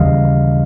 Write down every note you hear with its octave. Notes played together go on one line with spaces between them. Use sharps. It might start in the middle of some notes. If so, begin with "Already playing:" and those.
Already playing: D#2 C#3 E3 G3 D#5 F5